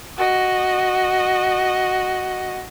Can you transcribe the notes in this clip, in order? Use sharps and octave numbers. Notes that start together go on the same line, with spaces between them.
F#4 D#5